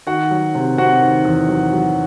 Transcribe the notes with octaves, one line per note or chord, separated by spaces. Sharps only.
D#3 F#4 F#5
F#3
C3
C3 F#4 F#5
D#3
E2
F#3
F#3